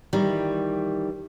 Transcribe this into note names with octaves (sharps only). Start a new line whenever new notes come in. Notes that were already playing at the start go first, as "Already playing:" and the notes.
D#3 E3 G3